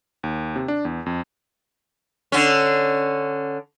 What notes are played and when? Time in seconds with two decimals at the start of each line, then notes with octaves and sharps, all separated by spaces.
0.23 D#2
0.56 C3
0.68 D4
0.85 E2
1.06 F2
2.32 D3 C#4